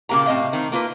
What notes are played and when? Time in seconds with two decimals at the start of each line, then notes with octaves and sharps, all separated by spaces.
0.09 A#2 C#3 A#3 G4 A#5
0.26 A2 G#3 C4 D#5 F5
0.53 D#3 C4
0.72 A#3 F4 B4